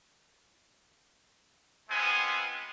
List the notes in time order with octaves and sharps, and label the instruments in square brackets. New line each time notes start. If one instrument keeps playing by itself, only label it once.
[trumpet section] G#3 B3 C4 F4 G#5